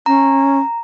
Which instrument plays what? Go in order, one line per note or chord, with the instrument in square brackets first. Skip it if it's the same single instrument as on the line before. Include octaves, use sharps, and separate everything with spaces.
[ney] C#4 [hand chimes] A#5